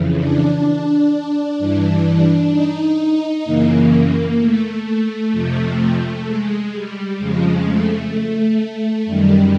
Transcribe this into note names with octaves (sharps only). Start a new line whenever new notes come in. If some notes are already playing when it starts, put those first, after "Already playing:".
Already playing: F2 C#3 E3
D4
G2 E3
D#4
F#2 C#3 E3 A#3
A3
F2 C3 F3
G#3
G3
F2 C#3 F3 G#3
A3
F#2 D#3 G3